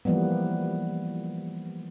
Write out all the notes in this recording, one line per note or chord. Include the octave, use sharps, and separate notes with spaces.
E3 F3 G3 A#3 B3